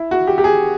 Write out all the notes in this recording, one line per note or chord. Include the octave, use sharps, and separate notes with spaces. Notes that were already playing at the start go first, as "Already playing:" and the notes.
Already playing: E4
F#4
G4
G4
G#4